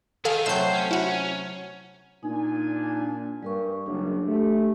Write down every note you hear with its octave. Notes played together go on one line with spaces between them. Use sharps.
D#3 D#4 G#4 A4 F5
C3 F#3 A3 C5 E6 G6
C#4
E4 F#4
A#2 D4 D#4 G#5
G2 G3 A#4 C#6
F#1 D4
A3 G4